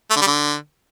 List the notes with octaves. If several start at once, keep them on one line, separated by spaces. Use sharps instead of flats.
A3
D3
G3
D3